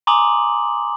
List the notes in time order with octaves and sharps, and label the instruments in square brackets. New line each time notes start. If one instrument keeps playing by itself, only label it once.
[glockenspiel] G#5 A#5 C6 D6 D#6 F#7